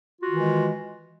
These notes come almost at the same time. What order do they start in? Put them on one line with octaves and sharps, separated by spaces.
F4 F#4 D#3 E3 G#3